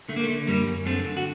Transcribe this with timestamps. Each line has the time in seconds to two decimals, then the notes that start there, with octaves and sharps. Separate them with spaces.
0.09 D3 A3
0.16 A#3
0.24 A3
0.29 D3
0.47 F#2 G3 A#3
0.67 F#2
0.85 D3 A3 C4
1.05 D3
1.17 F#4